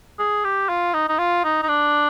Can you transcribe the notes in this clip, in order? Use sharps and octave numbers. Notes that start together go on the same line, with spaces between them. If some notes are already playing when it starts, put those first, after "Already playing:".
G#4
G4
F4
D#4
D#4
F4
D#4
D#4
D4